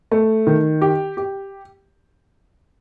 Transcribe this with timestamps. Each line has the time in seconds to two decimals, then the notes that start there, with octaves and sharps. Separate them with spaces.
0.11 A3
0.47 D#3
0.82 G4
1.17 G4